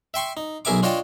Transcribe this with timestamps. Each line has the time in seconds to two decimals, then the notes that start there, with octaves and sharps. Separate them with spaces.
0.14 E5 G5 C6 C#6
0.37 D#4
0.65 B1 G#4 A#4 E5 G#5 D6
0.83 D4 F4 C#5 D#5 G5 A5